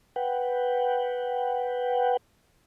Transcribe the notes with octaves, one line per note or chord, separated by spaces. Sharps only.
B4 F#5 G5